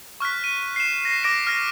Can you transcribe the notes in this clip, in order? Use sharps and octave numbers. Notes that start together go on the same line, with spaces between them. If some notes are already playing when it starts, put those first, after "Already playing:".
C#6 F6 F#6 B6
D#7
C7 E7
A#6 C7
D6 A#6 D7
F6 A#6